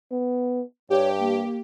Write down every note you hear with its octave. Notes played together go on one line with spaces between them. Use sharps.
B3
G2 G4 C#5
A#3